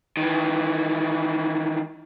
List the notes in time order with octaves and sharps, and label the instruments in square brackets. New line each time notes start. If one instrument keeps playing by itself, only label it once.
[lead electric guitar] D#3 E3